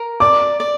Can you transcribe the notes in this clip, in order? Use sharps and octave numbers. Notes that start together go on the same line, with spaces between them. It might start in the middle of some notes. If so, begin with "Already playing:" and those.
Already playing: A#4
D5 D6
D5